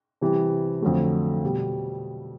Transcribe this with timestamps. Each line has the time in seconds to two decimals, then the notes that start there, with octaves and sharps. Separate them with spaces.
0.21 C3 E3 G3
0.82 F2 D3 F#3 A3
1.44 B2 G3